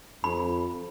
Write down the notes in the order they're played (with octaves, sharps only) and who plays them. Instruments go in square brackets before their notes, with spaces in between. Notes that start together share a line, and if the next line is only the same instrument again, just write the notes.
[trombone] F2 [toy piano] B5